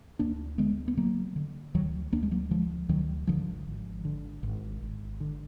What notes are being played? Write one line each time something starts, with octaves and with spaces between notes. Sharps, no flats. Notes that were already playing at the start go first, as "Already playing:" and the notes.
D2 A#3 D4
D3 G#3 B3
B3
D3 F#3 A#3
D3
D2 D#3 F#3
D2 A#3 D4
G#3
F#3 A#3
D3 F3 G#3
D2 D#3 F#3
G#1 D3 F3
G#1
D3
G#1
G#1
D3